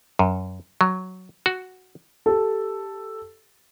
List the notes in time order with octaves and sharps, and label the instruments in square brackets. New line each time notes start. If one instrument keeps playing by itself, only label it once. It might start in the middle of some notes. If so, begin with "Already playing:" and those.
[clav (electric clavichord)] F#2
F#3
F#4
[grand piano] G4 A4